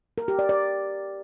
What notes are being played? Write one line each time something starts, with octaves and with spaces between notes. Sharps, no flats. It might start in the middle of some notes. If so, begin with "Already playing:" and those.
A#4
G4
D5
D5